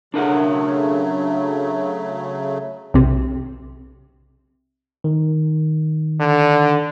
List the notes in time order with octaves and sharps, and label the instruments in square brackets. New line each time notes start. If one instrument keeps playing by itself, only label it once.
[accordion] C#3 F#3 A3 [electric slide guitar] D4 A#4 F#5
[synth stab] B1 C3
[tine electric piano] D#3
[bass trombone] D3